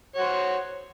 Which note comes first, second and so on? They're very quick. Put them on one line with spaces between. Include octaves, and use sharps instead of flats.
C#5 F#4 C5